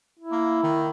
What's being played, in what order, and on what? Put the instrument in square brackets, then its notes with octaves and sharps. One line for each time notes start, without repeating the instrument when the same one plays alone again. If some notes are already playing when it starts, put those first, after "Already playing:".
[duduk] E4
[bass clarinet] A#3
D#3